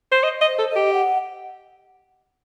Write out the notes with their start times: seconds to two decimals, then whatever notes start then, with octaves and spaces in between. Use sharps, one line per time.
0.12 C5
0.23 D#5
0.41 D#5
0.47 C5
0.59 A4
0.70 D#5
0.76 G4
0.93 F#5